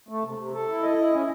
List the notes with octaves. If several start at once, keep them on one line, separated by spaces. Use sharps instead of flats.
A3
C3
C3
A4
E4
D#5
E4
C#4